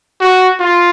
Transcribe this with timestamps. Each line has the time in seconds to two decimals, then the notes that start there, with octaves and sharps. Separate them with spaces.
0.20 F#4
0.60 F4